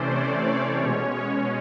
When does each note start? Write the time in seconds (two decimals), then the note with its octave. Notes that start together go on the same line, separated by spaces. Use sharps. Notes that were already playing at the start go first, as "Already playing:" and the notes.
Already playing: C3 E3 A3 C#4 C5 D5
0.10 C#5
0.46 C#5
0.81 B2 G#3 C#4